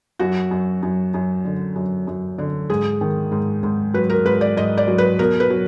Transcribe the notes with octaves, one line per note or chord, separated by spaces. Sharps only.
F#2 F#4
F#2
F#2
F#2
D3
F#2
F#2
D3
G#2 G#4
D#3
G#2
G#2
F#3 B4
A#4
G#2 B4
D5
G#2 D#5
D5
F#3
B4
B2 A#4
B4
F#3